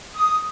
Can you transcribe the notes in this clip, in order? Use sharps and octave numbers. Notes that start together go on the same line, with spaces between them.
D#6